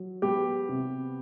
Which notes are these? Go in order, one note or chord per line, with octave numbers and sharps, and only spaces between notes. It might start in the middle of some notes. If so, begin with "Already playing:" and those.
Already playing: F#3
B3 G4
C3